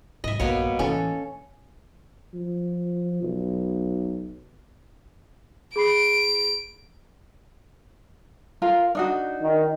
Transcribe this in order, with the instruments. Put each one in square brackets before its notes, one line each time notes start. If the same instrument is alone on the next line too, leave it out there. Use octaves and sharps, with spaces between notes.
[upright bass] G#2 F#3 [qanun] D#5 E5
[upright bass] A#1 G2 [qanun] B2 A#3 C#5
[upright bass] A2 E3 [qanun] C#4 A4
[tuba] F3
B1
[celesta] G#4 B5 C7 [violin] D7
[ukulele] F4 A#4 F5
D4 D#4 F#4
[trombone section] D#3